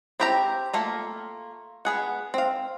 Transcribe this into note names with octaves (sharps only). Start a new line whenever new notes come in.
C4 E4 G4 G5 A#5
A3 A#3 F4
B3 G#4 F#5
C4 F5